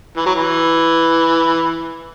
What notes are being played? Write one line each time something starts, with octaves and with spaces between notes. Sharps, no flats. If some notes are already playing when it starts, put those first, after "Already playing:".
E3
F#3
E3